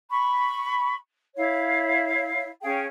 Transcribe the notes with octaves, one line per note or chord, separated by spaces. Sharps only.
B5 C#6
E4 C#5 F5
C#4 G#4 F5 G5